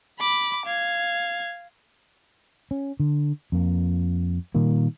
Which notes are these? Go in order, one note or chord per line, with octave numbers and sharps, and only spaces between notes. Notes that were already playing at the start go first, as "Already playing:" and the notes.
B5 D6
F5 G#6
C#4
D3
F2 A#3
A#2 D#3 G3 A#3